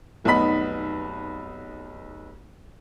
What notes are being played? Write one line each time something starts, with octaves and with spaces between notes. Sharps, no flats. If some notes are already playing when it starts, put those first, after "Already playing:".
F1 B1 B3 D#4 B5 B6